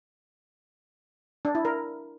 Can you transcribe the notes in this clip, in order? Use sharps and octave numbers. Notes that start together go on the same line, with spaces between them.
D4
E4
A#4